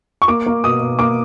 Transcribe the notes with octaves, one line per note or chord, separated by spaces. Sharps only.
C#6
A#3 D6
A#3
B2 D#6
B2
A#3 D6